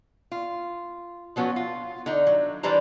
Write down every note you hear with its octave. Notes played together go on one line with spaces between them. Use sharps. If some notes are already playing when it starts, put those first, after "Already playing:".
F4
F3 F#3 B3 C#4 F#4
F4
D3 D#4
F#3
E3 G3 D4 B4 C5 A#5